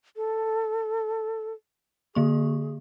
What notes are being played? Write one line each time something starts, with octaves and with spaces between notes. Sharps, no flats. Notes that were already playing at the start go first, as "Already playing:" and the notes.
A4
D3 A#3 G#4 C#6